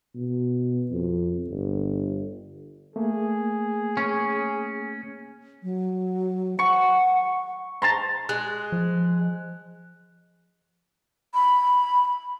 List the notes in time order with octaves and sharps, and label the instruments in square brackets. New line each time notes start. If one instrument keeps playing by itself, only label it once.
[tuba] B2
F2
G1
[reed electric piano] A3 A#3 [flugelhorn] G#4
[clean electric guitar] C#4
[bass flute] F#3
[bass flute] F#5 [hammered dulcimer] C#6
[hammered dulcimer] A5 A#5 C6
[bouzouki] G#3 [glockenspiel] F#6
[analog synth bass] F3
[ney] B5